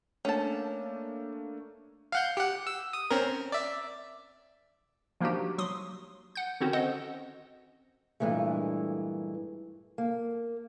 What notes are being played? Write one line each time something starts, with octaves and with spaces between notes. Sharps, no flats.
A3 A#3 C#4 D4 A5
F5 F#5 G6
G4 F#5
E6
D#6
C4 C#4 A#4
D5 E5
F3 A#3 D4 D#4 F#4 G4
F#3 C6 D#6
F#5 G6
D3 D#3 C4 C#4 F#4
A4 C5 D#5 F#5
G2 A#2 E3 G#3 A3
A#3